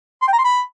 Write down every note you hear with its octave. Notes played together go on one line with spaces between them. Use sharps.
C6
G5
A#5
C6
B5